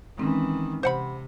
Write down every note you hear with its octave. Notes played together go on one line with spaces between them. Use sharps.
D#3 E3 G#3 C4 C#4
C3 C5 F#5 B5